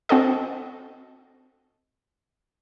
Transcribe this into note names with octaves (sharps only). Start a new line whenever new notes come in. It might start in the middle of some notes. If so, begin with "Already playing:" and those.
C4 F#4 A4 D#5